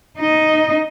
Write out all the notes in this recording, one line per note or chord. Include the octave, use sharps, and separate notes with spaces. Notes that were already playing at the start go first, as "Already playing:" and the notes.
D#4 D#5